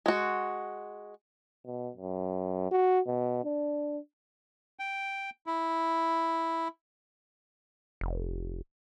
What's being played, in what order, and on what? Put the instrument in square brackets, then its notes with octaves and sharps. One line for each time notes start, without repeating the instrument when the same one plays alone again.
[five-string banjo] G#3 F#4
[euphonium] B2
F#2
F#4
B2
D4
[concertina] G5
E4
[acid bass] F1